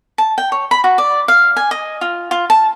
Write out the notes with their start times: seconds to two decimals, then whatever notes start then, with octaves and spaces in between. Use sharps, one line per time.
0.18 A5
0.38 G5
0.52 C#5
0.71 B5
0.84 F#4
0.98 D5
1.28 F5
1.56 G#5
1.71 D#5
2.01 F4
2.31 F4
2.50 A5